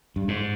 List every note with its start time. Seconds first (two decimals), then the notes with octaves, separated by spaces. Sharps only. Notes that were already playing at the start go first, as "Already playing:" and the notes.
0.16 G2
0.28 G#2